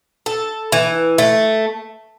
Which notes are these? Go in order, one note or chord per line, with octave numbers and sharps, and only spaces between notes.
A4
E3
A3